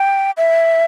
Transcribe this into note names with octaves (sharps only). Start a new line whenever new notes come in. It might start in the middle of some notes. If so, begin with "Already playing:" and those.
Already playing: G5
E5